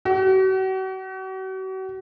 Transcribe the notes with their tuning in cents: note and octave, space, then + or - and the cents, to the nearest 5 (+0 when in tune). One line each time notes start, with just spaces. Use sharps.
F#4 +40